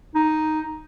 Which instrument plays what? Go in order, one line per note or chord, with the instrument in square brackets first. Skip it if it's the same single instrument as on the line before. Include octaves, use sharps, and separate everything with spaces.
[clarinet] D#4